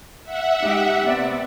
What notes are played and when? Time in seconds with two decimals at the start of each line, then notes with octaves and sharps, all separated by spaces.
0.24 E5 F#5
0.62 G#3 D#4 G4
1.03 C3 B3 D5